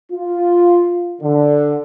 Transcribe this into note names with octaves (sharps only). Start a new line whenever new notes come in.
F4
D3